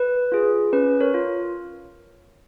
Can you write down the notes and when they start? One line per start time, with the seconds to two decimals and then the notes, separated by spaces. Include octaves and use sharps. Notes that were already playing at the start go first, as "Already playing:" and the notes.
Already playing: B4
0.32 F4 G#4
0.73 C#4 B4
1.01 A#4 C#5
1.14 F4